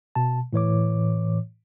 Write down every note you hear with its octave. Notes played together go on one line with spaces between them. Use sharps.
B2 A5
A2 E3 C#5 D6